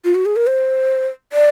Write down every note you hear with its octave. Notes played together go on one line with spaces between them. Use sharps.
F4
F#4
G#4
A#4
C5
D5